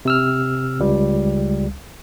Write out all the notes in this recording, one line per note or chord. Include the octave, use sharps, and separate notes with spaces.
C3 E6 F6
C#2 G3